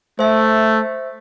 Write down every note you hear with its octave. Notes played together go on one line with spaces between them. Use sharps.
A3 C5 E5